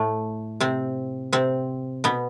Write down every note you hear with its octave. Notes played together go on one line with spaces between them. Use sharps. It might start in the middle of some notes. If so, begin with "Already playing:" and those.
Already playing: A2 A3
C3 C4
C3 C4
B2 B3